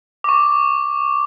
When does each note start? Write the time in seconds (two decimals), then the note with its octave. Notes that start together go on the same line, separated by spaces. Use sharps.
0.24 C#6 D6